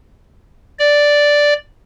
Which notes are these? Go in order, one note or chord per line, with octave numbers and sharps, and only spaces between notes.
D5